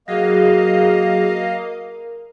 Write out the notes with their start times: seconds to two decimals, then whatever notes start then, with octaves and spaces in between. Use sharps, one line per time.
0.08 F#3 A#3 F#4 G#4 D#5 F5
1.30 A#4